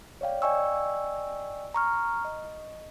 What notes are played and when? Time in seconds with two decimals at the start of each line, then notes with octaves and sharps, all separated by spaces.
0.21 C#5 D5 F5 G5
0.42 D5 D#5 G5 G#5 C#6 E6
1.74 A#5 C#6 F6
2.25 D#5